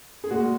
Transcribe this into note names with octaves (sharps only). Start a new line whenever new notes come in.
G#4
A#2 G#3 F#4